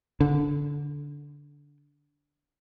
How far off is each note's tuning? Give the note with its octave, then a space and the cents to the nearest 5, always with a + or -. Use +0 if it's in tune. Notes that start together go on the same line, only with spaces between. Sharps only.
D3 -15